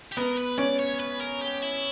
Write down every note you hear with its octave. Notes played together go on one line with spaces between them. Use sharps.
G4
B3 A#4
B4
C#4 D5
C#5
B4
A#4
G4
E4